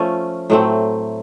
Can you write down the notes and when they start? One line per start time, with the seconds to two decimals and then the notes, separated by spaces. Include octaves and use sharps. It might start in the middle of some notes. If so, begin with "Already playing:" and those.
Already playing: F3 A3 C#4
0.50 A2 F#3 A3 C4